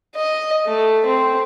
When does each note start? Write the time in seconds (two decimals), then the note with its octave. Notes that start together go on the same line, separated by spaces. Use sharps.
0.15 D#5
0.66 A3
1.05 C4